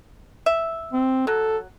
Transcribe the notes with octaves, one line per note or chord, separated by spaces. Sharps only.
E5
C4
F#3 A4